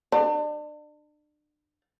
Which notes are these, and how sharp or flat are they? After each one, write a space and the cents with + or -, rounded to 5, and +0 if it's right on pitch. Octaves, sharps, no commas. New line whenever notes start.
D4 +35